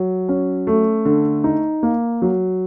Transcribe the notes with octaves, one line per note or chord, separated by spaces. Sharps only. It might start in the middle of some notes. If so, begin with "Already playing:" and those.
Already playing: F#3
C#4
A3
D3
D#4
A#3
F#3